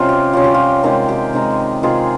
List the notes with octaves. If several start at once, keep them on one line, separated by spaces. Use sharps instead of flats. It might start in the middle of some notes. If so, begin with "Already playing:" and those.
Already playing: C3 G3 C#4 F4 D#5
G4
C3 G3 C#4 F4
G4
F4
C3 D#3 G#3 D#4 G4
G4
C3 D#3 G#3 D#4
C3 D#3 G#3 D#4 F4 G#4